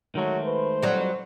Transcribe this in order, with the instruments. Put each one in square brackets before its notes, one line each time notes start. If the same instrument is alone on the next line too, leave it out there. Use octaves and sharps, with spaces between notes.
[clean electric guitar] D#3 G#3 A3 [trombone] F#3
[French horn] B4 [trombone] C5
[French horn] F2 [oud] F#3 G3